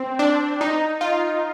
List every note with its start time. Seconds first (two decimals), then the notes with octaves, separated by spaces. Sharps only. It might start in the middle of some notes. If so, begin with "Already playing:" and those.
Already playing: C4
0.19 D4
0.61 D#4
1.01 F4